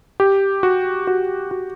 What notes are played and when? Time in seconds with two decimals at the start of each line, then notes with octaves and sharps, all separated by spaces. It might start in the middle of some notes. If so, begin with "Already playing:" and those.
0.20 G4
0.63 F#4
1.07 F#4
1.51 F#4